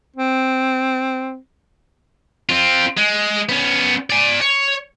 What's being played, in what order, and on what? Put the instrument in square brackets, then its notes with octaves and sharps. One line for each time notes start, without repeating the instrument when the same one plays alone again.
[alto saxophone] C4
[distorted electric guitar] C4 F4
G#3
B3 C#4
D5 G#5
C#5